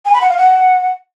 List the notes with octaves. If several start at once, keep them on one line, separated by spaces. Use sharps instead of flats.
G#5
B5
F#5
F5
F#5